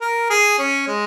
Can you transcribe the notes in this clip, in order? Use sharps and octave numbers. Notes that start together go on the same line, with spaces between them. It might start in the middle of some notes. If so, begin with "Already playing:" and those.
A#4
G#4
C#4
G#3